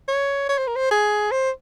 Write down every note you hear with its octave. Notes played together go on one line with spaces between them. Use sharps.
C#5
C#5
C5
A#4
C5
G#4
C5